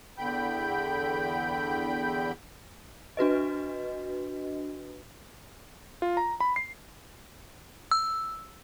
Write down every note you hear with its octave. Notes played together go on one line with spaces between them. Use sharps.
E2 D3 G5 B5 G6
D4 F#4 B4 D#5
F4
A#5
B5
C7
E6